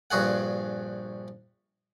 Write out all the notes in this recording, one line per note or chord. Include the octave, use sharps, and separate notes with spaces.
A#1 G2 F#4 G#4 F#5